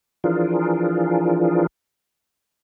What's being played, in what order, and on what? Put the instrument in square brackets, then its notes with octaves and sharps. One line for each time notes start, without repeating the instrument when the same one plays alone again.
[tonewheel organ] E3 F3 D4 F4 G#4 A#4